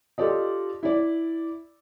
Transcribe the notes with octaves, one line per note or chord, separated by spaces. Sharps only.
F4 G4 A4 D5 D#5
E4 D5